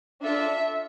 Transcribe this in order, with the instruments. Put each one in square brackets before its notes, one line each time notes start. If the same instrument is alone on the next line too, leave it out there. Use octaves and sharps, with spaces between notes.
[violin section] D4 F4 A4 E5